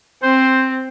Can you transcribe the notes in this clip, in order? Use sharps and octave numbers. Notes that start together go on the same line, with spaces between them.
C4 C5